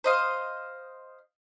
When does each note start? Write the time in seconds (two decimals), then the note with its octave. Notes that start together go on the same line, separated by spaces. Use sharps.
0.04 C5 D#5 F5